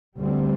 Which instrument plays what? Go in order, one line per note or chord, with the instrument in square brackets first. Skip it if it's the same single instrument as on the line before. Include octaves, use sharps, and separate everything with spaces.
[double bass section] D2 D3 G3 C4